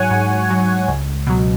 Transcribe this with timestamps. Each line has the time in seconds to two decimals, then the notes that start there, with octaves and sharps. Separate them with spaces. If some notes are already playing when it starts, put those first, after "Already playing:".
Already playing: G#2 F#3 C#5 F#5 G#5
0.11 G#2
0.50 F#3
0.88 C#2
1.27 B2 F#3